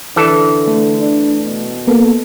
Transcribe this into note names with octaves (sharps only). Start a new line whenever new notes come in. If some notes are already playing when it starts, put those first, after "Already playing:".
D3 E3 A4
A3
D4
B2
A#3 B3 A4